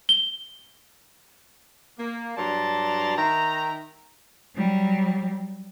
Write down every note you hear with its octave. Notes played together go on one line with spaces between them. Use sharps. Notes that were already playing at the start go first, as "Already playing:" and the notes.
G7
A#3
G2 F#3 D5 A5 A#5 C6
D#3 E5 G5 A#5
F#3 G3